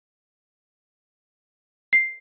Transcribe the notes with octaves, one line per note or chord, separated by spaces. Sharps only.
C7